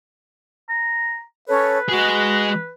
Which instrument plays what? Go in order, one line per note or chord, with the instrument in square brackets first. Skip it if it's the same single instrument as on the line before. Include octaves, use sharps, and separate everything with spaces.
[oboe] A#5
[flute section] C#4 A4 C#5 [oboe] B4
[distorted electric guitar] G#3 G#4 [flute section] F#4